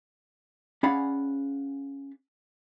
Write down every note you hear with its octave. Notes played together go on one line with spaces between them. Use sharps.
C#4 G#4 D5 F5 F#5 B5